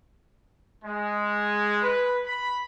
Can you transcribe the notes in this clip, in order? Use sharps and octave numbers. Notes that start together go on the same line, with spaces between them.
G#3
B4
B5